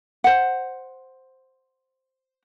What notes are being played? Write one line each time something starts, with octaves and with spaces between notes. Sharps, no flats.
C5 F#5